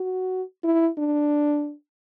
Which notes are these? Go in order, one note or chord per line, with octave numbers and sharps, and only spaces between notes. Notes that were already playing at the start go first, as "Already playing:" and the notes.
Already playing: F#4
E4
D4